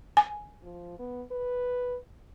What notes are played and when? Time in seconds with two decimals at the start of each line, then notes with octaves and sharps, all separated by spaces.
0.17 G#5
0.63 F3
0.99 B3
1.32 B4